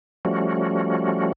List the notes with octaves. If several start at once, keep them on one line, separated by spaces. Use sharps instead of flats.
F3 G3 A3 C#4 F#4